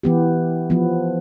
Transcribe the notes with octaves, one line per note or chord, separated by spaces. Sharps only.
E3 B3 G4
F3 B3